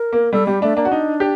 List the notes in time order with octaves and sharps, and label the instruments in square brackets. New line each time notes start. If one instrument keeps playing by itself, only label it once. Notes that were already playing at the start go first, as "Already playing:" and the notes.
Already playing: [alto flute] A#4
[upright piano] A#3
[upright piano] G3 [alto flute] A4
[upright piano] G3 [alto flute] G4
[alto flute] A3 [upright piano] D4
[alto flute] A#3 [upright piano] D4
[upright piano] F#4
[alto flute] D4 [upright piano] D#4
[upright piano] G4